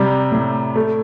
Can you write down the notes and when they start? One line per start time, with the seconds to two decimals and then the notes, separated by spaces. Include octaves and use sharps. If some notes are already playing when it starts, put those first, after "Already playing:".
Already playing: C3 G3 A#5
0.32 A2
0.76 A3